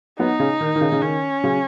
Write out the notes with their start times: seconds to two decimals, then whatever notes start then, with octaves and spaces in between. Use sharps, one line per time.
0.19 F#3 B3 D#4
0.40 C#3
0.60 D#3
0.76 D#3
0.81 C#3
0.92 C#3
1.02 D#3 C#4
1.44 C#3 F#3